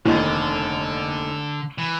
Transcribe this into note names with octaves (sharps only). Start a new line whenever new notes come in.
F1 D#2 D3 D#3
E3